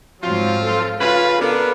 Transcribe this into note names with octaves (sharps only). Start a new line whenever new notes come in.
G#2 F3 F#3 C4 F4
A4
C#3 F4 B4
B3 D4 A4 A#4